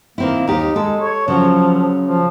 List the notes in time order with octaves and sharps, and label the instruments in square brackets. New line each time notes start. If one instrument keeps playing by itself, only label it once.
[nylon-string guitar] D#3 C4 E4 [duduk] A#3
[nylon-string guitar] D#2 G4 [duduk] D#4
[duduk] G#3 [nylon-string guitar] A4
[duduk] C#5
[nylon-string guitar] C#3 F#3 [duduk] F3
[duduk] F3